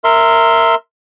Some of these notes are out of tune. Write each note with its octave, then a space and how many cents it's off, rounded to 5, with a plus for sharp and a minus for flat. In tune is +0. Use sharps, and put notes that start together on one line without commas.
A#4 -10 E5 +0 C6 +0